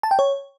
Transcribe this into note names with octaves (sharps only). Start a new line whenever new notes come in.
A5
G5
C#5